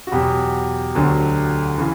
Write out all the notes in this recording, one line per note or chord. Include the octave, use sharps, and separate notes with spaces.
F#4
E2 B2 F#3 G4
D2 D3 F#3
C#3 E3